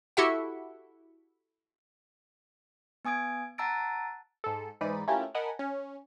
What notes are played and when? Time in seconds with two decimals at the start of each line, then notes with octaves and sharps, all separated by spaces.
0.17 E4 F#4 G4 A4 E5 F#5
3.05 B3 G#5 D#6 G#6 D7
3.58 F#5 A5 A#5 E6 A6 D7
4.44 G#2 A4
4.81 G#2 E3 D#4 D5 B5 D#7
5.08 A3 C#4 E4 F4 G4 A#4
5.35 A#4 D#5 F#5 G#5 A5 B5
5.59 C#4